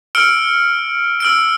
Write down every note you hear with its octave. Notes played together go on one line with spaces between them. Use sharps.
E6 F6 C#7 D7
E6 F6 D7